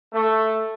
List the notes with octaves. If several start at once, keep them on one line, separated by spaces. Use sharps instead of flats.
A3